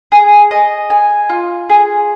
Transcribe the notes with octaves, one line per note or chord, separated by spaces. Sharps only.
G#4
D#5
G#5
F4
G#4